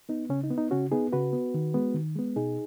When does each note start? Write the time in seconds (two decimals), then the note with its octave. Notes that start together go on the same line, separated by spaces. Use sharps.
0.09 B3 D#4
0.29 C#3 C#4
0.44 D#4
0.50 B3
0.58 D#4
0.71 C#3 C#4 F#4
0.92 B3 D#4 G#4
1.13 C#3 F#4 B4
1.33 B3
1.54 D#3
1.74 G#3 B3
1.94 D#3
2.16 G#3 B3
2.36 B2 D#4 G#4